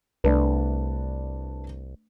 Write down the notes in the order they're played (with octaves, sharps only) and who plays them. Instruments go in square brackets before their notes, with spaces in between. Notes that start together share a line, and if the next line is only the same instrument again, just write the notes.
[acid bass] C2 [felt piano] A3 D4 B4